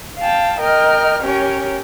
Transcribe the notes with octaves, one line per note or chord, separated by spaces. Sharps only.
F5 G5 A5
A#4 D#5 G5 F6
C#4 G4 A#4 C#5